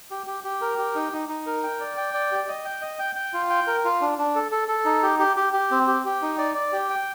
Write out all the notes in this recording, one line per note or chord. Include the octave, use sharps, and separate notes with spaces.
G4
G4
G4
A#4
G4
D#4
D#4
D#4
A#4
G5
D5
G5
D5
G4
D#5
G5
D#5
G5
G5
F4
G5
A#4
F4
D4
D4
A4
A4
A4
D#4
G4
G4
G4
G4
C4
G4
G4
D#4
D5
D5
G4
G5